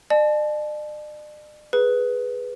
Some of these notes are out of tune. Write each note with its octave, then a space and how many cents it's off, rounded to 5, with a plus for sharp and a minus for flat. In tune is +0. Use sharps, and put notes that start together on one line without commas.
D5 +45 A5 -35
G#4 +0 B4 +0